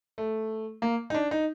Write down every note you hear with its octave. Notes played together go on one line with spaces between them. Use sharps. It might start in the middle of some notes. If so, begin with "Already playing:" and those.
A3
A#3
D#4
D4
D#4